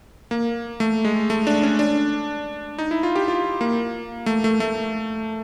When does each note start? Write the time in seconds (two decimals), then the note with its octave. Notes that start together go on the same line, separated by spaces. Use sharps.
0.31 A#3
0.80 A3
1.05 G#3
1.30 A3
1.47 D4
1.63 C#4
1.79 D4
2.79 D#4
2.91 E4
3.03 F4
3.15 G4
3.28 F4
3.61 A#3
4.26 A3
4.44 A3
4.60 A3